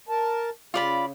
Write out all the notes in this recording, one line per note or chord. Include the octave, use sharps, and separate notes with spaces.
A#4 A5
C#3 F4 D5 B5